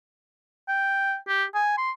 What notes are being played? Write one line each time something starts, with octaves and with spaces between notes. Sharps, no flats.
G5
G4
G#5
C6